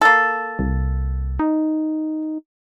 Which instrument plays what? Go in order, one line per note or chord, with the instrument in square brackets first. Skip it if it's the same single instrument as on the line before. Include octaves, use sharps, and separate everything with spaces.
[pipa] A#3 A4
[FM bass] C2
D#4